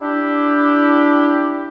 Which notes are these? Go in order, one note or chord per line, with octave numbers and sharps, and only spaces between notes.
D4 E4 G4